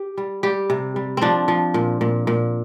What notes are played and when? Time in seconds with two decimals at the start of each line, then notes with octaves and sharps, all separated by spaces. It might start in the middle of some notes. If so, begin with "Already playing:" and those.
Already playing: G4
0.17 G3
0.43 G3 G4
0.70 C3
0.96 G3
1.17 F3 C4 D4
1.48 F3
1.74 A#2
2.01 A#2
2.27 A#2